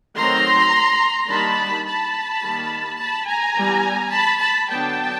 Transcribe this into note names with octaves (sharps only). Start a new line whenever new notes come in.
D#3 F#3 A3 C4 A#5 C6
D#3 G3 A#3 D4 A5 B5
A5 B5
D#3 G3 A#3
A5 B5
G#5 A#5
E3 G3 B3
A5 B5
A5 B5
D3 F#3 B3 D4 G5 A5